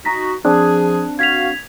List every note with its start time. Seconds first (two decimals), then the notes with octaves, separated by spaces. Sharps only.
0.05 D#4 F#4 A#5 A#6 B6
0.45 F3 C4 D4 G#4 A5 F#6
1.19 F#4 F5 G#6 B6 F7